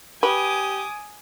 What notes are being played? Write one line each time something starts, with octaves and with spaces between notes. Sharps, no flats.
G4 B4 G#5 D6 D#6